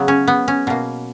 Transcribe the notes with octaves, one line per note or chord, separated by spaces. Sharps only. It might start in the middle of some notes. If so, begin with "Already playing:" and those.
Already playing: C#3 F#3 B3
C#4
B3
C#4
B2 A#3